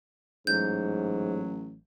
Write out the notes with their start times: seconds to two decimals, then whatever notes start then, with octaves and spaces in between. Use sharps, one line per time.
0.47 A1 G#2 F#3 G6